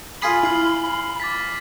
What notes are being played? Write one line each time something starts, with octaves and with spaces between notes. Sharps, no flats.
F4 G#4 B5 D#6 B6 C7
E4 F6 C7 F#7
D6 A6 B6